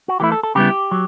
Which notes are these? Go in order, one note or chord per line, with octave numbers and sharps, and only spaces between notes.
F#4
E3 A3 E4 G4
A4
A4
C#3 G3 B3 E4 G4
F#3